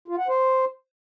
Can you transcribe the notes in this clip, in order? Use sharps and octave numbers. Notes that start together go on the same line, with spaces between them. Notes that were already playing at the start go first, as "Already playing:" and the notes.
F4
F#5
C5